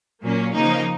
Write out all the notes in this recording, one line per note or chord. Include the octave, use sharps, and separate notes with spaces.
A#2 F#3 A#3 C#4
C#3 F3 A#3 D#4